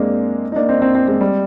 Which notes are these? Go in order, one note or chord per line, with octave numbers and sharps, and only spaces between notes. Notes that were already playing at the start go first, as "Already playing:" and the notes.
Already playing: G#3 A#3 C4 D4
D#4
A#3 D4
C4 D#4
C4 D#4
C4 D#4
G#3 C4
G3